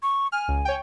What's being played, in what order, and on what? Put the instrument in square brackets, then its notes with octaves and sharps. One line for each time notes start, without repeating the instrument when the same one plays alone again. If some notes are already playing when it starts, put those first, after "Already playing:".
[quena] C#6
[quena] G#5 [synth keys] F6
[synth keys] C#2
C#5 G5